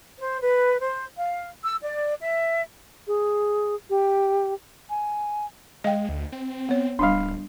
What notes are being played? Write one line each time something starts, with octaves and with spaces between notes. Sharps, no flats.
C5
B4
C5
F5
E6
D5
E5
G#4
G4
G#5
G#3 D#5 F5 G5
D2
C4
B3 C#5
D1 G3 D4 F5 B5 C6